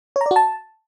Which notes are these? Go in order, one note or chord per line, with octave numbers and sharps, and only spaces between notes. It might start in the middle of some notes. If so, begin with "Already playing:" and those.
C#5
A#5
D5
F#4
A5